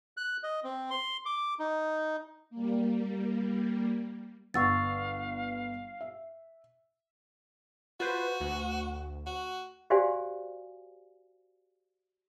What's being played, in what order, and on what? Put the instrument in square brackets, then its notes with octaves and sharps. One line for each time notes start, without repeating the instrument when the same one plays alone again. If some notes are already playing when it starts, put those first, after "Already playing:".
[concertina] F#6
D#5
C4
C6
D6
D#4
[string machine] G3 A#3
[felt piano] G1 F#5 [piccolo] F5 [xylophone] C#6 E6 A6
[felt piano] E5
[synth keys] F4 B4 C5 [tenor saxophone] F#4
[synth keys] D2
[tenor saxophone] F#4
[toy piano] F#4 G4 C5 D5 F5 G#5